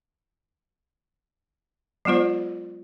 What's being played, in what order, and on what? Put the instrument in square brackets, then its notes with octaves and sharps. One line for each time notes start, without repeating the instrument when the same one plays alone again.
[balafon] F#3 G#3 B3 F4 C5